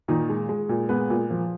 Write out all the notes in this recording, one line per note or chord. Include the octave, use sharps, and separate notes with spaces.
A#2 D#3 D#4
G#3
G#3
A#2
G#3 B3 B4
A#2
F3